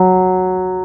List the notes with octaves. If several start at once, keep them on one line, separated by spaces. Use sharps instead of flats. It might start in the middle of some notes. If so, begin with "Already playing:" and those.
Already playing: F#3